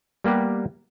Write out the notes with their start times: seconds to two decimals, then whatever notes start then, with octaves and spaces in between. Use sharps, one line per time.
0.24 G3 A#3 B3 G4 B4